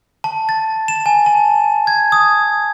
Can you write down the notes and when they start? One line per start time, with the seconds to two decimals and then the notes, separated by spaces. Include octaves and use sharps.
0.24 A5
0.49 A6
0.88 E7
1.06 G#5
1.26 A5
1.87 G#6
2.12 D#6